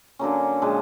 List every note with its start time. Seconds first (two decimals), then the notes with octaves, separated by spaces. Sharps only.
0.19 D3 F#3 A#3 C#4
0.62 A#2 F3 G#3